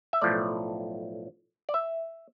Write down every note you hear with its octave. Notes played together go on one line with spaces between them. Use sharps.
E5
B1 A2 F3 A3 D5
D5
E5